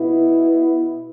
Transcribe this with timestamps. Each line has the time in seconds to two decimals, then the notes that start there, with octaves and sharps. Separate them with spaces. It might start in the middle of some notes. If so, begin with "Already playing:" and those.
Already playing: B2 B3 E4